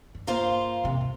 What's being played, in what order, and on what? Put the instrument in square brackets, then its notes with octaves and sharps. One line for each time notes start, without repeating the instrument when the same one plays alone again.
[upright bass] G2
[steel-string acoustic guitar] A#3 F4 C5
[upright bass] G#2 C3
G2